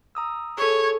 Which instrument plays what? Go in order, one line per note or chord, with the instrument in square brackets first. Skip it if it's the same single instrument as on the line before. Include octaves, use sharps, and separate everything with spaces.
[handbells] A#5 D#6 E6
[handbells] G#4 A4 [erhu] C#5